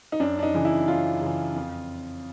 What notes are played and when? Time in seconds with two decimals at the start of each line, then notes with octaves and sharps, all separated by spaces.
0.12 D#4
0.20 F#2 D4
0.39 D4
0.43 D#4
0.54 C#3 E3
0.65 E4
0.88 F#2 F4
1.22 C#3 E3
1.56 F2